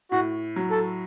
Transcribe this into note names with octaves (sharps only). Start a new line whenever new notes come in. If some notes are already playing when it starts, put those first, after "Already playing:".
A2 F#4
F#3
A4